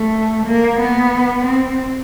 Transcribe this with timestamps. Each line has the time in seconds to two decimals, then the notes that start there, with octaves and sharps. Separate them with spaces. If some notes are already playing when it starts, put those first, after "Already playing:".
Already playing: A3
0.46 A#3
0.80 B3
1.45 C4